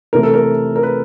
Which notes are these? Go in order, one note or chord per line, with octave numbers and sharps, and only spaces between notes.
E2 C3 E3 A3 A#4
A4
A#4
A#4
B4